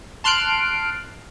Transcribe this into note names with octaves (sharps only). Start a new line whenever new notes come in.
A5 C6 F6 F#6 C7 D7